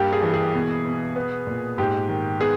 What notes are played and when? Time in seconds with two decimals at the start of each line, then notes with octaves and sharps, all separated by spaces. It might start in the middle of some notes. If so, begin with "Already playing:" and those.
Already playing: G2 G3 A#3 G4
0.13 G#4
0.23 E3
0.34 G#4
0.54 B2
0.85 B2
1.16 B3
1.47 A#2
1.78 G#2 G4
2.09 D#3
2.40 B3 G#4